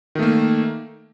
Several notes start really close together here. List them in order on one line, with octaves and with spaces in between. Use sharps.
D#3 A3 A#3